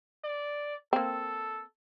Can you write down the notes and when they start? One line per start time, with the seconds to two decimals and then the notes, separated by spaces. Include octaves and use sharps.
0.24 D5
0.93 A#3 C4 A4